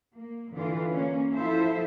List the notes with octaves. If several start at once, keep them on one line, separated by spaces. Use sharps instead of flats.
A#3
D3 E3 F4
A#3 C#4
F3 E4 F4 A4 C5 E5